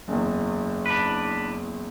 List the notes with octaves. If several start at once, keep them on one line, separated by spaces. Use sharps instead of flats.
F#1 E2
D4 B4